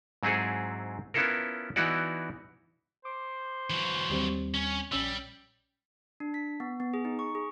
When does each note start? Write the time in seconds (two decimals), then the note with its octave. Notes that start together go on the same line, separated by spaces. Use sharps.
0.23 G#2 F#3 C4 E4 G#4 A4
1.14 B3 C#4 E4 F4 A4 A#4
1.76 E3 B3 D#4 E4 F#4 D5
3.05 C5 D6
3.70 E3 F#3
4.10 D#2 G3 C4
4.54 C#4
4.92 A#1 G3 C#4 E6
6.20 D4
6.34 B6
6.60 B3
6.80 B3
6.94 G#4
7.05 D#4
7.19 C#6
7.35 G#4